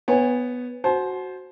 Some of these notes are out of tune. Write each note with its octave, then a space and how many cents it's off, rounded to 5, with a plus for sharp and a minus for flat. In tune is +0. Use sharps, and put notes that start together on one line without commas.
B3 +0 C#5 -15 G#5 -30
F#4 +0 C5 +5 A5 -40